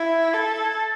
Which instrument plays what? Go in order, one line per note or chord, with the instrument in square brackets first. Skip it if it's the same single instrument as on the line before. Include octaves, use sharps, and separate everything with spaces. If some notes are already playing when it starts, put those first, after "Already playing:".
Already playing: [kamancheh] E4 [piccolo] G#6
[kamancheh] A4 [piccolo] G#6
[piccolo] A6